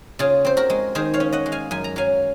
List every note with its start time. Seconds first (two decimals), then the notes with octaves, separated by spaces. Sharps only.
0.19 C#3 F4 G#4
0.45 C4 C5
0.57 F#4 A#4
0.70 G#3
0.95 D#3 G#4 C5
1.14 C#5 F5
1.20 C#4
1.32 D#5 F#5
1.46 G#3
1.52 F5 G#5
1.71 F#2 G#5
1.84 A#5
1.96 F#3 F5 G#5